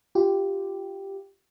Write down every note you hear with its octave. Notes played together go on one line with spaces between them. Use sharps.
F4 G4